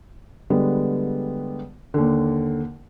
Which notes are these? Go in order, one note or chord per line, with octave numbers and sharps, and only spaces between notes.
D3 G3 G#3 B3
D#2 D3